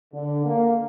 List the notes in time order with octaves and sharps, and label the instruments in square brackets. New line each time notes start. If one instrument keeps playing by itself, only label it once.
[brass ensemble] D3
A#3